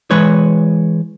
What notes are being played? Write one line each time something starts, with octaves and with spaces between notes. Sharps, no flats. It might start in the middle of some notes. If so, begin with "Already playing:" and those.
E3 G#3 B4 C#5